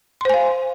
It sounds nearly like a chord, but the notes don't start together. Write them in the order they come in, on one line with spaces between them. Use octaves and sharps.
C6 C5 G#5 F5